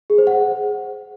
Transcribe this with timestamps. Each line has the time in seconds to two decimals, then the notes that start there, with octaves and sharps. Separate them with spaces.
0.10 G#4
0.18 C5
0.27 F#5